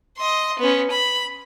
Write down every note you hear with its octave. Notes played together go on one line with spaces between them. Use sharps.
D#5 C6
B3 C#4
B5